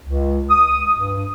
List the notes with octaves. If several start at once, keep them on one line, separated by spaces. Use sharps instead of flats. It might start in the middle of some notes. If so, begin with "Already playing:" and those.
C#2
D#6
G2